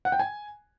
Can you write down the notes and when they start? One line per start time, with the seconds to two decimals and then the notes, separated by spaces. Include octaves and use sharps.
0.05 F#5
0.12 G5
0.20 G#5